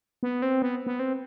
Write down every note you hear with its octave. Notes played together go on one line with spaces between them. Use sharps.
B3
C4
B3
B3
C4